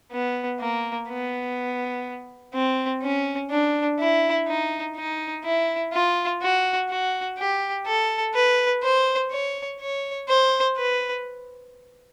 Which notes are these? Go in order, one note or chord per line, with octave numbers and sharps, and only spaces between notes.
B3
A#3
B3
C4
C#4
D4
E4
D#4
D#4
E4
F4
F#4
F#4
G4
A4
B4
C5
C#5
C#5
C5
B4